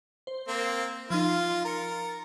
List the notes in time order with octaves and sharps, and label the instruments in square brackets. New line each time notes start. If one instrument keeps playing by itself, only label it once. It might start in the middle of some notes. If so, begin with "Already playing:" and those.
[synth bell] C5
[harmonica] A#3 C4
[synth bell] F3 D#4 [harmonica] F4
[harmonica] A#4 [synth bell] A6 C#7